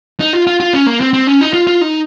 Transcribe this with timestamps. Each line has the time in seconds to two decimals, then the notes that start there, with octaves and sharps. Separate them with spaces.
0.20 D#4
0.33 F4
0.47 F4
0.60 F4
0.73 C#4
0.86 A#3
1.00 C4
1.13 C4
1.27 C#4
1.41 D#4
1.53 F4
1.67 F4
1.81 D#4